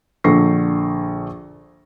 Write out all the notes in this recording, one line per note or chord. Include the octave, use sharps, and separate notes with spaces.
A#1 D3 A4 C#6 A#6 C7